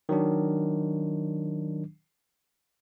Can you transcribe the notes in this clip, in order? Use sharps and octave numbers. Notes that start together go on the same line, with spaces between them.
D#3 F#3 D4